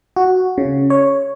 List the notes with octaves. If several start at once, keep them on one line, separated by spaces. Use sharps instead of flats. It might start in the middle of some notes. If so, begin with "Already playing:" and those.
F#4
C#3
C#5